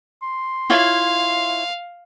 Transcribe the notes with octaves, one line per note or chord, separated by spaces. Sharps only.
C6
E4 F4 C#5 F5